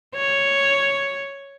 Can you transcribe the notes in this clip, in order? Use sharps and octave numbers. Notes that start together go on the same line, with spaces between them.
C#5